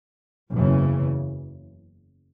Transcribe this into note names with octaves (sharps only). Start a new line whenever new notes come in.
F#1 E2 C#3 E3